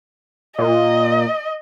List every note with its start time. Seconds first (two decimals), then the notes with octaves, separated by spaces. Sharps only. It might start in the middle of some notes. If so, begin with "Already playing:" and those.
0.58 A#2 D#5